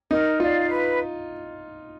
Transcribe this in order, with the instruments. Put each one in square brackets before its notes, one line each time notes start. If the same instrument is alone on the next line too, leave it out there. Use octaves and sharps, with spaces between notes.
[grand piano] D#4 [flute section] A#4
[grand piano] F4 [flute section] D5 F5
[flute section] B4